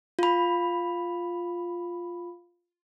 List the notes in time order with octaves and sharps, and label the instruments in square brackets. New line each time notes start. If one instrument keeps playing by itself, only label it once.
[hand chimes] F4 B5